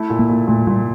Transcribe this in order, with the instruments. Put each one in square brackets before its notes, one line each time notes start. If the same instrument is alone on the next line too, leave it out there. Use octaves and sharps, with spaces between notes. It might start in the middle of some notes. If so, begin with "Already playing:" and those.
Already playing: [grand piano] A3 E4
A#2
[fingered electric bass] A#3
[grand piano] A#2
[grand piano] A#2 [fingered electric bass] A3
[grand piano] A#2 [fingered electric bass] G3